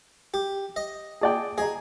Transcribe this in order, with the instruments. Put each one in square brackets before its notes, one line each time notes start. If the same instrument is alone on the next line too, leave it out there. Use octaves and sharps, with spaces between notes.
[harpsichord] G4
D#5
[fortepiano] G#4 D5 G5
[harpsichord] G#4 [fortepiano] D#5 A#5